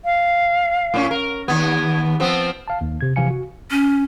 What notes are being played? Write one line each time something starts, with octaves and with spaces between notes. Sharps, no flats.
F5
A2 C#4
A#4
D#2 B3 G#6
F3 B3 C4 E6
F5 A5
D#2
C3 G#6
C3 E3 F3 F5 G#5 C#7
F#4
C#4